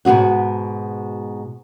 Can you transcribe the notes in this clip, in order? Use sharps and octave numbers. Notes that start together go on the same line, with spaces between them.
G#2 B2 F3 F#4 F#5